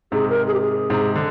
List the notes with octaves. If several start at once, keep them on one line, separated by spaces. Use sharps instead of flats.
G#2 C3 G#4
A#4
G#4
G4
G#4
G#2 C3
D3